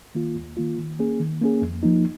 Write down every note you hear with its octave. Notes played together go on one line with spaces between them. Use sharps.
D#3 A#3 F4
D#2
D#3 A#3 F4
D#3
A#3 C#4 G#4
D#3
A#3 C#4 G#4
F2
F3 A#3 D#4